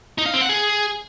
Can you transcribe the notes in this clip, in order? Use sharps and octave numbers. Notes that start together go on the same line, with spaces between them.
D#4
F5
C4
F#5
G#4